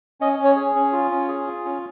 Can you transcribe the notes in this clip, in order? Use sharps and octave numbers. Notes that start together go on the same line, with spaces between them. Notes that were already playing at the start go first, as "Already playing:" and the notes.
C#4 D#5
C#4
C#5
G#4
C#4
F4
C#4
G#4
F4
C#4